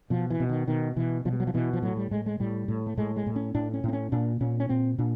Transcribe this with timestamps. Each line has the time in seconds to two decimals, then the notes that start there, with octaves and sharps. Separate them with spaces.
0.10 B2 F3
0.30 E3
0.40 B2
0.49 D#3
0.68 B2 D#3
0.96 B2 E3
1.25 B2 F3
1.33 G3
1.40 F#3
1.47 F3
1.54 B2 E3
1.73 F3
1.82 A2 F#3
1.97 G3
2.11 A2 G#3
2.26 G#3
2.40 A2 G3
2.68 A2
2.86 A3
2.97 A2 G#3
3.16 G#3
3.27 A2
3.36 C#4
3.55 A2 D4
3.74 C#4
3.84 A2 C4
3.93 C#4
4.12 A#2 D4
4.40 A#2 C#4
4.60 C#4
4.69 A#2 C4
4.98 A#2 D4